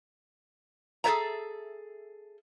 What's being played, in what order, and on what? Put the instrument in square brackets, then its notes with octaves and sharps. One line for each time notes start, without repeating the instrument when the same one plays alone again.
[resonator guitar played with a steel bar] G#4 A4 B4 C#5 E5 A#5